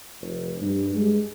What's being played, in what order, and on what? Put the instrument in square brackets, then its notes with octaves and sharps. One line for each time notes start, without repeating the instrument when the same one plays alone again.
[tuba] F1
G2
G#3